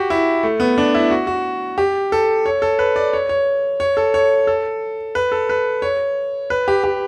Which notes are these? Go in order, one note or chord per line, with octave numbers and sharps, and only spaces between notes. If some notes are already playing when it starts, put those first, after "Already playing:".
Already playing: F#4 G4
E4
A3
B3
D4
E4
F#4
F#4
G4
A4
C#5
A4
B4
D5
C#5
C#5
C#5
A4
C#5
A4
B4
A4
B4
C#5
B4
G4
G4